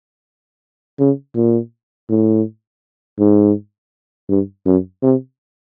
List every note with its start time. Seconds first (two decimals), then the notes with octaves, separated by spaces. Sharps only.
0.99 C#3
1.36 A#2
2.09 A2
3.19 G#2
4.29 G2
4.66 F#2
5.03 C3